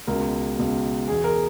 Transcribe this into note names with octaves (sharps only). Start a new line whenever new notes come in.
C#2 B2 A#4
C#2 B2
E2 B2 G#4
A#4